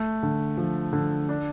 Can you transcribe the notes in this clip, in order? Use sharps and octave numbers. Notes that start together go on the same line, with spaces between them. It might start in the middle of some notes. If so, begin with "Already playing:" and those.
Already playing: A3
D3
F3
D3
D4